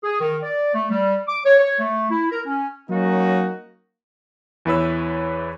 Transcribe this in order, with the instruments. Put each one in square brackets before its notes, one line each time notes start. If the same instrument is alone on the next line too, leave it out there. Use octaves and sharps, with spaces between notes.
[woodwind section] G#4
D#3
D5
A3
G3
D6
C#5
C#5
A3
E4
A#4
C#4
[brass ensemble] F#3 A#3 C#4 D#4 F#4
[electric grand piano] E2 E3 E4 B4 C#5 E6